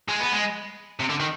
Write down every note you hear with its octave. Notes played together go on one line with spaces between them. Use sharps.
G#3
B3
G#3
C3
D3
D#3